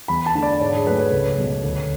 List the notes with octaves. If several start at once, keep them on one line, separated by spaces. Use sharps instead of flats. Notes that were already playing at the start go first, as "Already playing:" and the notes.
E2 B5
A5
D3 A3
D5
G#2 C#5
G#4
F#3 A3 B4
C#5
C#2
B2 G#3
D2